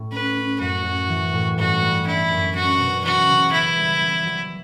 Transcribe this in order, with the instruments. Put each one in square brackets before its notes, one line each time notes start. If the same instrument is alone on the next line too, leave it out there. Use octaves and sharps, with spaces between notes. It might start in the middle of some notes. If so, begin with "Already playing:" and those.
Already playing: [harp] A2
[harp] C#4 [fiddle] B4
[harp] C#4
[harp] F#2 [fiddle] F#4
[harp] F#2
E3
A2
[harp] G2 [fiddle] F#4
[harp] G3
[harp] D4 [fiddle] E4
[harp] F#2
[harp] C#4 [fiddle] F#4
[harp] B2
[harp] E3 [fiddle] F#4
[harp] C#3
[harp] B3 [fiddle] E4
[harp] G3
F#3
F#3